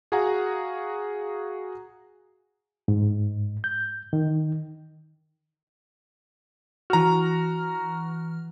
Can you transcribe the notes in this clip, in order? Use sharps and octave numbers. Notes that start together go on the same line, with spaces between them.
F#4 G#4 F5 F#5 G#5 A#5
G#2
G6
D#3
E3 F#4 A#5 F6